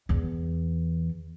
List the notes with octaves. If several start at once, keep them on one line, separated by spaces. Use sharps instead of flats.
E2